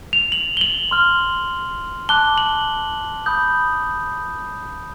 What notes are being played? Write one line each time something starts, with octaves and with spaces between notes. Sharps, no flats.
F7
F#7
G7
F#7
C6 F6
A5 D6 F#6 G7
F#7
B5 D#6 G6